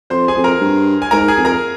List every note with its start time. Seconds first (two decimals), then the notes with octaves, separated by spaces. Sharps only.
0.10 F2 C5 C6
0.28 G#4 G#5
0.36 F2
0.44 A#4 A#5
0.61 G2
1.02 G#5
1.11 G#2 A#4 A#5
1.28 G#4 G#5
1.37 F2
1.45 A#4 A#5